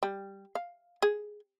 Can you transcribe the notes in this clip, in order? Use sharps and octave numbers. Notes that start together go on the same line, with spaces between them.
G3
F5
G#4